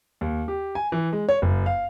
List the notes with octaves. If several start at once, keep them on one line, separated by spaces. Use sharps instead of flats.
D#2
G4
G#5
E3
G#3
C#5
F#1
F5